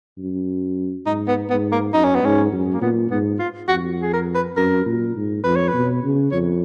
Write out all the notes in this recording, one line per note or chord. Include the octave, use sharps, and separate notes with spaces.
F#2
G#2 D#4
B3
G#2 B3
A#3
F#2 D#4
C#4
B3
G#2 C#4
F#2
A#3
A#2 B3
G#2 B3
F4
F2 F#4
G#4
A#4
B4
F#2 A#4
A#2
G#2
F2 B4
C#5
B4
B2
C#3
F2 C#5